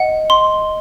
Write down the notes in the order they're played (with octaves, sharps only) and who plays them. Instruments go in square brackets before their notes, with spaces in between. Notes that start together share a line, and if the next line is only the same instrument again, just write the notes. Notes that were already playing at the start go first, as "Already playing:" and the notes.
Already playing: [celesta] D#5 [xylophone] F#5
[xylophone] C6